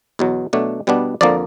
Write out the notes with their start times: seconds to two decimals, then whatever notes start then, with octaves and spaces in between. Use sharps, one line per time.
0.19 E2 B2 F#3
0.53 B2 F#3 A3 D4
0.87 B2 G3 B3 D4
1.21 F2 D3 F3 A#3 D5